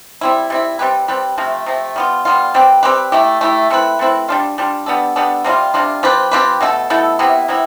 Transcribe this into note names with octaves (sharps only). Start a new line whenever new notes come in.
G3 C4 E4
G3 C4 E4
G3 C4 G4 B4
G3 C4 G4 B4
C3 F3 A3
C3 F3 A3
G3 B3 F4
G3 B3 F4
G3 C4 G4 B4
G3 C4 G4 B4
A3 E4 G4
A3 E4 G4
A3 C4 E4 B4
A3 C4 E4 B4
G3 D4 F4
G3 D4 F4
G3 B3 D4 A4
G3 B3 D4 A4
C3 G3 D4 F4
C3 G3 D4 F4
F3 C4 G4 B4
F3 C4 G4 B4
B2 A3 E4 A4
B2 A3 E4 A4
C3 G3 B3 E4
C3 G3 B3 E4